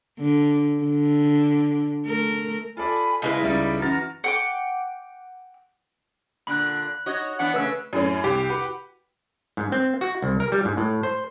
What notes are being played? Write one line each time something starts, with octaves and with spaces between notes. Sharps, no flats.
D3
D3
A3 A#4
F4 A4 D5 G#5 B5
C#3 G#3 E4 B4 D#5
C#2 G3 D#4 D5
F#2 E3 F#4 A#5 F6 A6
F#5 G5 D6
A#2 D3 B5 F#6
D#4 F#4 C#5 D#5
E3 B3 D4 F#5
C#3 A3 C#4 B4 E6
F#2 A2 C#4
C2 G4
F#4 B4 F#5
G#2
C4
F#4
C2
A#4
G3
G#2
A2
C5